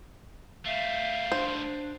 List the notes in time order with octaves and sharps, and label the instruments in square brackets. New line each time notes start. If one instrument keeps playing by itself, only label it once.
[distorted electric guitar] G3 A3 [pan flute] E5 [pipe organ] F5
[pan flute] D4 [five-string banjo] C5